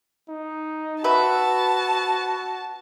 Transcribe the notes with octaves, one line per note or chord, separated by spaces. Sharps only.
D#4
F#4 B4 E5 A5